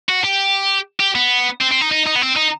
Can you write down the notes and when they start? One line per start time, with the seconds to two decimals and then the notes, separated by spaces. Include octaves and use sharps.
0.09 F#4
0.24 G4
1.00 G4
1.15 B3
1.61 C4
1.71 C4
1.81 D#4
1.91 D#4
2.07 D#4
2.16 B3
2.22 C4
2.37 D#4